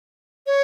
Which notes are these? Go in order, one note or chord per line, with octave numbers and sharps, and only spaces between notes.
C#5